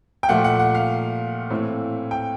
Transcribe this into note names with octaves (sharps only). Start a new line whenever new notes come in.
G5
A#2 F3 A3 F#5
F#5
F#5
F5
A2 E3 A3 C4
G5